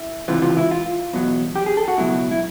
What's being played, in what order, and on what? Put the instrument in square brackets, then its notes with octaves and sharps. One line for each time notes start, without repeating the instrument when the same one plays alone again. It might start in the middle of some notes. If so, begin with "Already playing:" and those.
Already playing: [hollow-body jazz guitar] E4
C#2 C3 E3 F4
F4
E4
F4
E2 B2 F#3
G4
G#4
A4
F#4
C#2 B2 F#3 E4
E4